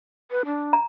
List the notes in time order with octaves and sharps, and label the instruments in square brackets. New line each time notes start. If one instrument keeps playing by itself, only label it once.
[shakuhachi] B4
D4
[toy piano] A#5